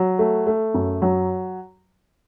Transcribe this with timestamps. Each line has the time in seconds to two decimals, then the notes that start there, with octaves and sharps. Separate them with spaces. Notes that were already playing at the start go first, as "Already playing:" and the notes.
Already playing: F#3
0.19 A3
0.47 A3
0.74 F#2
1.02 F#3